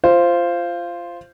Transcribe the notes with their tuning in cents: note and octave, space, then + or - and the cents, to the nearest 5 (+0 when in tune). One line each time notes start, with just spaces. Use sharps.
F4 -15 C5 +0